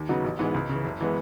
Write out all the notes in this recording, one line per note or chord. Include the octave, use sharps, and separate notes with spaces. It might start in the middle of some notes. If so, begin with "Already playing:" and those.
Already playing: D#2
C#3 F#3 B3 D#4
A1
G#2 E3 G#3 B3
C#2
C#3 E3
F#1
E3 G#3 B3